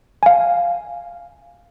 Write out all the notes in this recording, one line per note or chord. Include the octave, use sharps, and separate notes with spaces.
F5 G#5